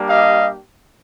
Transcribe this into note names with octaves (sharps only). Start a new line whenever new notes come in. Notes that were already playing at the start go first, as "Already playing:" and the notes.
Already playing: G3 A#3 D4 G4
D#5 F5